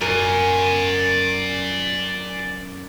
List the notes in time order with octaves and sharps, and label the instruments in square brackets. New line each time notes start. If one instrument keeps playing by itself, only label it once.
[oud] F#2 [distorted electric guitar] D5 G#5